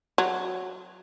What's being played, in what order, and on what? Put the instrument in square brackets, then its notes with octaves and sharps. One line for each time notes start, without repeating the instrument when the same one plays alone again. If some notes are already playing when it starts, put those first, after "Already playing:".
[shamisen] F#3